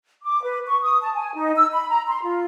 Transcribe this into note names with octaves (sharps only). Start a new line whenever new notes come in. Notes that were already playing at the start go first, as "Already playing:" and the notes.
D6
B4
C#6
D#6
A5
G#5
D#4
E6
B5
A#5
C6
F4